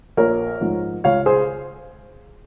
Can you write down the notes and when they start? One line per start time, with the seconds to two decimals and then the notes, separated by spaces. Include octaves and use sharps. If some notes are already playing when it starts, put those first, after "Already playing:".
0.17 A#1 A#4 C#5
0.61 G#2 F3
1.04 C#2 C#5 F5
1.26 G#4 C5